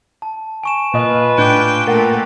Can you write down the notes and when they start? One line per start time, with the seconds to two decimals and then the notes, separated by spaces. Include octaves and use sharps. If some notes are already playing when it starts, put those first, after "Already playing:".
0.22 A5
0.64 G#5 C#6 E7
0.94 A#2 F4 B4 D#5
1.38 A2 D4 G5 D6 F#6 G6
1.87 A#2 A3 A#4 F#5 G5 A6